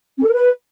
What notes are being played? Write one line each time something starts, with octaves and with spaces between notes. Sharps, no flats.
C#4
A4
A#4
B4